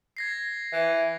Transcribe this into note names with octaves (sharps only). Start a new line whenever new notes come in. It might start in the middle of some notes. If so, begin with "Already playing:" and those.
G#6 A#6 C7
E3